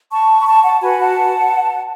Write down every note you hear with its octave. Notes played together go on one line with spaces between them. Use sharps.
A5 C#6
B5
A5 C#6
F#5 A5
F#4 B4 G#5 B5
F#5 A5